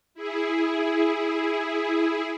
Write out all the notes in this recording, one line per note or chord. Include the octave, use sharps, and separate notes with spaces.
E4 G#4